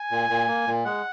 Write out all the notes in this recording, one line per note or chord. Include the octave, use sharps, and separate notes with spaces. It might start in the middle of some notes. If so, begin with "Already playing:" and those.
Already playing: G#5
A#2
A#2
A#3
A#2
G#3 F#5